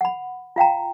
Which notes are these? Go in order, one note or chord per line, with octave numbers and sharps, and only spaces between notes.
F#5 B5
F4 F5 G5 A#5